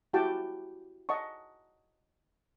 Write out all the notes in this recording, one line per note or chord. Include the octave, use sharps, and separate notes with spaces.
E4 F#4 G4 F#5 G5 A5
D#5 F#5 A5 C#6